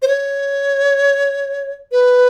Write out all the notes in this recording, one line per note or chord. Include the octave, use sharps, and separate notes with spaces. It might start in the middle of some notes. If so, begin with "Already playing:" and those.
C5
C#5
B4